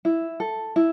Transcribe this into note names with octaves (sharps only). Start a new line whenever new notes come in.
E4
A4
E4